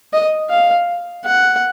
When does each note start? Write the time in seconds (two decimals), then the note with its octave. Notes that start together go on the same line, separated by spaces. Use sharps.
0.13 D#5
0.50 F5
1.25 F#5